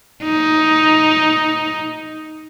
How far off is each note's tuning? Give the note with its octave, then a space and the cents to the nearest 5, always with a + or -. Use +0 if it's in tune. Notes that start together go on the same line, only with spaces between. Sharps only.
D#4 +5